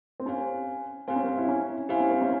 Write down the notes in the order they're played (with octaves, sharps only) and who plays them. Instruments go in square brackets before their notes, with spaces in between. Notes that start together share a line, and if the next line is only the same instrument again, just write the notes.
[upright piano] C4
[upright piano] C#4 [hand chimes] G4 C5 F5 G#5
[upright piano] C4 [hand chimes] G4 C5 F5 G#5
[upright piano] C#4
C4
E4
C#4
[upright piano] E4 [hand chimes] G4 C5 F5 G#5
[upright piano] C#4
C4
C#4